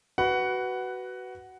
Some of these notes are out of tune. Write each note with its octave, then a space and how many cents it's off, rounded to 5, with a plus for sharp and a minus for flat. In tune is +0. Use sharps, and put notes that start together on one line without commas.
F#4 +15 B4 +0 F#5 +10